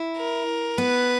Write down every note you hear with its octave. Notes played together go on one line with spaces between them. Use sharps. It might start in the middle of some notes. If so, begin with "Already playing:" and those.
Already playing: E4
A#4
B3 B4